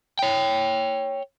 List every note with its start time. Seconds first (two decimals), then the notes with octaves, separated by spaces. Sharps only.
0.19 C#5 G5